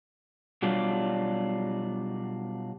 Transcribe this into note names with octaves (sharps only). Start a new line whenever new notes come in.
B2 F#3 G3 D4 F4